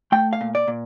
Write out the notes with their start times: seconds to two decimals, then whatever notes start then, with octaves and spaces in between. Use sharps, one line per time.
0.12 A3 G5
0.33 F5
0.41 A#2
0.55 D5
0.68 A#2